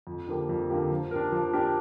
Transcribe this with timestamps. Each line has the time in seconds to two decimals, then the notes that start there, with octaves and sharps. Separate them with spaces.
0.07 F2
0.27 D3 F3 A#3 G4
0.49 F2
0.70 D3 F3 A#3 G4
0.91 F3
1.11 D4 G4 A#4
1.32 F3
1.53 D4 G4 A#4